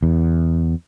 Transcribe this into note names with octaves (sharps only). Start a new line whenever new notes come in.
E2